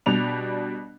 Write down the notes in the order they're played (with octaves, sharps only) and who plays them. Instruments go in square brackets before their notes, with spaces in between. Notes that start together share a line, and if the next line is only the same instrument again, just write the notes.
[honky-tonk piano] B2 G3 D4 F7